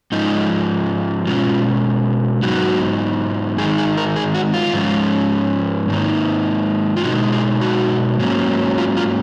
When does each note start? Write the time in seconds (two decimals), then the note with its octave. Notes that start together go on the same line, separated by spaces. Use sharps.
0.12 G#2 F3 G#3 D#4
1.27 B2 G#3 C#4 F4
2.43 G#2 F#3 B3 D#4 F#4
3.58 G#2 D#3 G#3 D#4 G#4
3.78 G#4
3.97 A#4
4.16 G#4
4.35 F#4
4.54 F4
4.74 G#2 F3 G#3 C#4
5.89 G#2 D#3 A#3 D#4
6.97 F4
7.04 B2 G#3 D#4 F#4
7.32 G#4
7.61 F#4
8.19 G#2 F#3 A#3 C#4
8.78 F4
8.97 F4